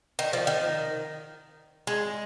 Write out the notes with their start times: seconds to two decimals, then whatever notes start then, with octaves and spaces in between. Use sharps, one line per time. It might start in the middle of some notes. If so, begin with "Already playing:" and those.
0.19 D#3
0.33 F3
0.47 D#3
1.87 G#3